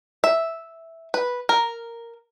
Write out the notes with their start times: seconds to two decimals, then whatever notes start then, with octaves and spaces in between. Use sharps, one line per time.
0.24 E5
1.14 B4
1.49 A#4